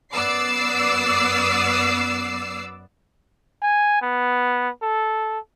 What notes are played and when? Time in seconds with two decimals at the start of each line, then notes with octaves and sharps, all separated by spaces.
0.14 F#2 B3 D5 D6 E6 C7
3.62 G#5
4.02 B3
4.82 A4